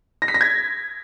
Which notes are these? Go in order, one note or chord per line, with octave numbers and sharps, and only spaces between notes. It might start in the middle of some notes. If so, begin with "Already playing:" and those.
A#6
B6
A#6
G#6